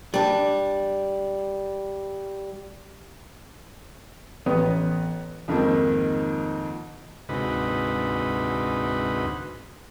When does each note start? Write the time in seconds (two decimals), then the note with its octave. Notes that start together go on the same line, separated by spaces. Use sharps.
0.14 G3 D4
4.46 A1 B3 D#6
5.48 F2 G#2 D#3 F3 A#3 C4
7.29 D2 G#2 C3 D#4 F#4 B4